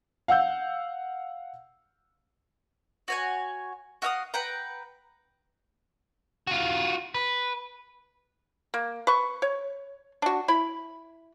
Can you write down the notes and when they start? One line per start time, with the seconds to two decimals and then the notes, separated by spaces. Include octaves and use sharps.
0.28 F5 F#5 E6 G6
3.08 F#4 C#5 G#5
4.02 F#4 E5 F5 D#6
4.34 B4 F#5 G5 A#5
6.47 F4 F#4
7.14 B4
8.74 A#3
9.07 B4 C#6
9.42 C#5
10.22 D4 F#4
10.48 E4 B5